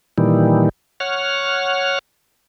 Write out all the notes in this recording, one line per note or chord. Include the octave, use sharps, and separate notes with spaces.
A#2 D#3 E3 G3
C#5 F#5 F6